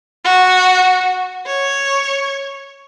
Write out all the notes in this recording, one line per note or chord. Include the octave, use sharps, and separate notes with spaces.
F#4
C#5